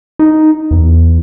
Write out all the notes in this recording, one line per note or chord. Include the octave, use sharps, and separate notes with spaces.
D#4
E2